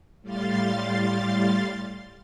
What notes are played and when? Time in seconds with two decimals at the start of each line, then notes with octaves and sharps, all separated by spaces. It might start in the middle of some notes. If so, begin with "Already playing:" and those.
0.22 A2 G3 F5 C6 A6